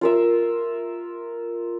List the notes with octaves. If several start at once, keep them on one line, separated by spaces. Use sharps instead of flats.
F4 A#4 E5